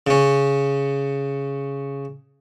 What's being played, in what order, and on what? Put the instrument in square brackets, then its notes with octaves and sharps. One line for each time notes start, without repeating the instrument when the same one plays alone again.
[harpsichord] C#3 C#4